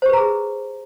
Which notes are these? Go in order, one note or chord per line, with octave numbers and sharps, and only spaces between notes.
G4 G#4 B4 C5 A#5